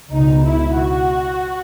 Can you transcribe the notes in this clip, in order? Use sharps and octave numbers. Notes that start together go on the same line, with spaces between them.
C#2 B2 D#4
E4
F#4